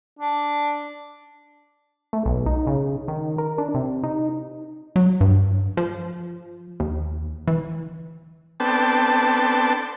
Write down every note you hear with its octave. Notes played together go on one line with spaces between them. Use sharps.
D4
A3
B1
D#4
C#3
D#3
A#4
D4
C3
D#4
F#3
G2
F3
D#2
E3
B3 C4 D4 A4 G5 A5